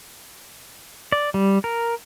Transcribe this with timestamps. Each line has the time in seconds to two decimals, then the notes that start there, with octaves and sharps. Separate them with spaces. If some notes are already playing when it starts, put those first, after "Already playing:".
1.12 D5
1.34 G3
1.64 A#4